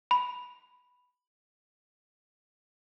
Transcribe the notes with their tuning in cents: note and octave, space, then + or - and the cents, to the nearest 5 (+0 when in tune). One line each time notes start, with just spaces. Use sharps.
B5 +0